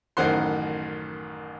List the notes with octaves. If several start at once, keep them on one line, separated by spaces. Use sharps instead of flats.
A1 F#2 D#3 C5 F#5 C6